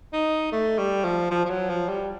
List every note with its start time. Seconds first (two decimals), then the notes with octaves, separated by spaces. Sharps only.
0.13 D#4
0.52 A3
0.78 G3
1.04 F3
1.31 F3
1.45 F3
1.50 F#3
1.70 F3
1.89 G3